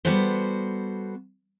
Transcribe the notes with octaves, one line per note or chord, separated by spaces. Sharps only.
G3 B3 F#4 A4 C5